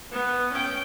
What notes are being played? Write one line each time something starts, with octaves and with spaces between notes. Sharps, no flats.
B3
C#4 G5